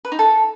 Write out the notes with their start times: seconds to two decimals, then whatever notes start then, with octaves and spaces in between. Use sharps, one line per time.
0.05 B4
0.12 D#4
0.19 A4